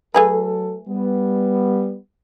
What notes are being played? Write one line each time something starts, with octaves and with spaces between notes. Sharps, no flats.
F#3 A3 G#4 A4 B4
G3 B3